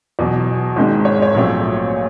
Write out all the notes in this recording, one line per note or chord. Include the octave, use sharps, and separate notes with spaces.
E2 B2 F#3
G#1 G#2 D#3 G#3 C4
C#5
C#5
A#1 A#2 F#3 A3 C4